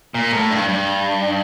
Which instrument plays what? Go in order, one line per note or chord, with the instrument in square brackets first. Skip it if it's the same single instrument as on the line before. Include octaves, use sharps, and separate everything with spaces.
[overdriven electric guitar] A#2
A2
G2
G2